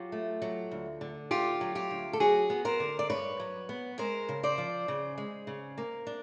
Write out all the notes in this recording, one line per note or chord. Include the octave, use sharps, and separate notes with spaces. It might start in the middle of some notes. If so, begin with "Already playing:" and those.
Already playing: F#3 F4 G4
A3
F#3
D2
D3
D2 F4 G4
F#3
F4 G4
D2
A4
F#3 F#4 G#4
B3
A#4 C5
D3
D5
G2 B4 C#5
F#3
B3
G#3 A#4 C5
C#3
C5 D5
F3
C#3
G#3
C#3
A#3
D4